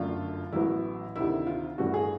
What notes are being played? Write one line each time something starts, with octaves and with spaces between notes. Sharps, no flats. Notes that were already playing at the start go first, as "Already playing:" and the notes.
Already playing: G1 F#2 D3 F#3 A3 F4
A1 A2 F#3 B3 E4
D2 C3 D#3 E4
F4
A1 G2 E3 A3 C#4 F#4
G#4